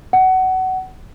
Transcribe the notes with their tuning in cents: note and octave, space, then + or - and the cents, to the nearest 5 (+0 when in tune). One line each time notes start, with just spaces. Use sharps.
F#5 +20